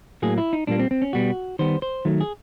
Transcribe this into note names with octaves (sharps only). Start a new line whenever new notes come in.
A2 F#3 A#3 G#4
E4
D#4
A#2 G3 A#3 D4
C4
C4
C#4
B2 G3 B3 F#4
D#3 G3 B3 C5
C5
D#3 F#3 A3
G#4